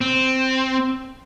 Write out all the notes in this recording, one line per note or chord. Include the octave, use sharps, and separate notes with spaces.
C4